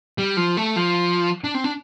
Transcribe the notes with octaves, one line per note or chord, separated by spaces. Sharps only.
G3
F3
A3
F3
D4
C4
D4